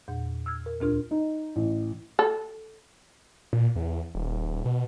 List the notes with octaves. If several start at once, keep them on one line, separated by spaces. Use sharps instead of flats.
E2 A#2
E6 F6 G#6
A#4
D2 A#2 D4 F4 A#4 F6
D#4
A1
A4
A#2
E2
D#1
B2